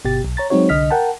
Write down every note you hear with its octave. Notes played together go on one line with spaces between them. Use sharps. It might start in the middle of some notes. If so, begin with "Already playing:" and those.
G1 B2 G4 A6
B1
C#5 A#5 A6
F#3 G#3 C4 D#4 F#4 C#5
C2 D3 D#5 F6 B6
A#4 F#5 G5 A5